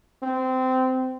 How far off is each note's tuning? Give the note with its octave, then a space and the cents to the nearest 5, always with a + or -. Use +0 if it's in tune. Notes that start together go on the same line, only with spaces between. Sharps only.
C4 -20